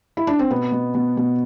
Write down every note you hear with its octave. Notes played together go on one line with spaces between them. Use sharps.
E4
D4
C4
B2 B3
B2
B2
B2